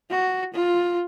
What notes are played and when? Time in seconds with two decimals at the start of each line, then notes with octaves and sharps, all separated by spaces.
0.10 F#4
0.54 F4